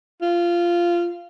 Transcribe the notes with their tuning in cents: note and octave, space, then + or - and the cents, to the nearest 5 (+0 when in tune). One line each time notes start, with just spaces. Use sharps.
F4 -15